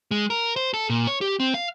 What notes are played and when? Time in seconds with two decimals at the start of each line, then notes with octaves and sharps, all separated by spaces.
0.11 G#3
0.30 A#4
0.56 C5
0.74 A4
0.89 A#2
1.07 C#5
1.21 G4
1.40 C4
1.54 F5